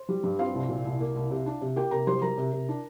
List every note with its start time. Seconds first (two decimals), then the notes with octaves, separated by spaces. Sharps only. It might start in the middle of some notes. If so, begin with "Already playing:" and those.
Already playing: C5
0.09 G3
0.24 G2
0.39 C4 F4 F5
0.54 C2
0.69 A#2
0.85 C2
1.00 A#3
1.15 C2
1.31 C3
1.46 D4
1.61 C3
1.76 A#3 G4 G5
1.91 C3 A#4 A#5
2.07 G3 C5 C6
2.22 G3 A#4 A#5
2.38 C3
2.53 C3
2.69 D4